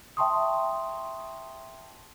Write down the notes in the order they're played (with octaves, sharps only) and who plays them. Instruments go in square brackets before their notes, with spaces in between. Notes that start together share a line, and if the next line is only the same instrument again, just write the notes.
[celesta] E5 G5 A5 C6 C#6 D#6